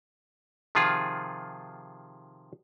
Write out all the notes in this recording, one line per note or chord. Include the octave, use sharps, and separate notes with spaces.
C3 D#3 F3 F4 G#4